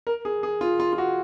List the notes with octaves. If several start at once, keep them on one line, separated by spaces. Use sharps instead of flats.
A#4
G#4
G#4
F4
F4
F4
F#4